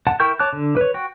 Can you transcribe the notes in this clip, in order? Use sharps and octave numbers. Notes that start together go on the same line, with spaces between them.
F#5 A5
E4 A#4 G5 C#6 G6
C#5 A5 D6 F#6
D3
B4 C#5
F#4 G5